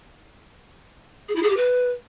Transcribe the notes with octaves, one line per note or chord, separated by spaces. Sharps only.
G#4
E4
G#4
G4
B4